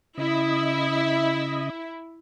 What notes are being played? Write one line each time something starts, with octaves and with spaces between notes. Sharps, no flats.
C#3 E4 D#5